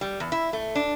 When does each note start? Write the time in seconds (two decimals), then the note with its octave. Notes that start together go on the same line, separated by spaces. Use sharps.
0.01 G3
0.20 E2
0.32 E4
0.53 A3
0.75 D4